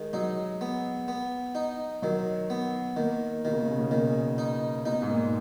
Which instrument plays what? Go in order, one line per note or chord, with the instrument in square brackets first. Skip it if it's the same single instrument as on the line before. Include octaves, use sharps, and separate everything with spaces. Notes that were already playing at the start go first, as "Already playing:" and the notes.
Already playing: [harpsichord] D#3 [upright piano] G#3
[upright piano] F#3 [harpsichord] D#4
[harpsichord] B3
B3
D#4
[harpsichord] D#3 [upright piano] F#3
[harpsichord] B3
[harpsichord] D#3 [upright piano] A#3
[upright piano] B2 [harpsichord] D#3
[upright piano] C#3
B2
C#3
B2
[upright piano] A#2 [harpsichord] D#3
[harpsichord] D#4
[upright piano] B2 [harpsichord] D#4
[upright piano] G#2
A#2